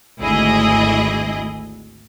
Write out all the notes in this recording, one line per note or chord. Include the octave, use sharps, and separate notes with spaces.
G#1 D2 E4 G#4 D#5